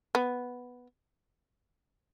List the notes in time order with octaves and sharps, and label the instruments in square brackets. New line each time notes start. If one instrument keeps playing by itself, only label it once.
[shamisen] B3